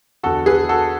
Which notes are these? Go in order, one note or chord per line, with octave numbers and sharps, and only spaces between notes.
E2 D3 F#4 A4
G#4 B4
F#4 A4